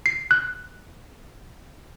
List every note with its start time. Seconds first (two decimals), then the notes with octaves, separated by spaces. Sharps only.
0.06 C7
0.31 F#6